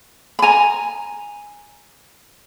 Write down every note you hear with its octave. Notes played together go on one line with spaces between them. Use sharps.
B5
G#5 A#5